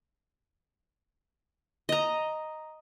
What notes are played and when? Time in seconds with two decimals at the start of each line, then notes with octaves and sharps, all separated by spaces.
1.89 D#5 A#5